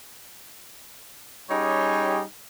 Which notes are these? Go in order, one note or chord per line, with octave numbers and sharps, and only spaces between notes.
G3 C#4 D#4 G4 G#4 C#5